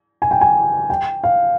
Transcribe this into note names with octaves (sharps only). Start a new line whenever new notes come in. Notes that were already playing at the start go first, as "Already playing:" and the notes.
G#5
G5
G#5
G5
F5